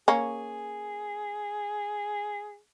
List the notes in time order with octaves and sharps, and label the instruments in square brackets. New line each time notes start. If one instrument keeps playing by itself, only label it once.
[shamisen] A#3 C#4 [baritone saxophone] G#4